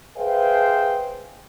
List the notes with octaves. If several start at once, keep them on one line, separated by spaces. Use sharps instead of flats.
G#4 B4 C5 E5 F5 G5